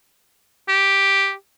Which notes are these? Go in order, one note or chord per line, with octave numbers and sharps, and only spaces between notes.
G4